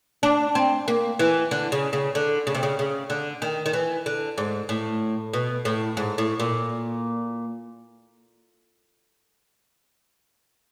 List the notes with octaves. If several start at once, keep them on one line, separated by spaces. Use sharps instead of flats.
D4
C4
A#3
E3
D3
C#3
C#3
D3
C#3
C3
C#3
C#3
D3
D#3
D#3
E3
D3
G#2
A2
B2
A2
G#2
A2
A#2